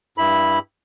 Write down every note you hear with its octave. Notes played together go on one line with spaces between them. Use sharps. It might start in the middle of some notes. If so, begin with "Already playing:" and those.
G2 E4 B5